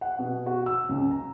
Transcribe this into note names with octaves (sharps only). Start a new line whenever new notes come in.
F#5
B2
F#4
E6
C#2
A#5